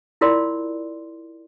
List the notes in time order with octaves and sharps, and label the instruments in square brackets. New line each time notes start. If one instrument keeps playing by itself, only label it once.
[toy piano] E4 F4 A#4 D5 C6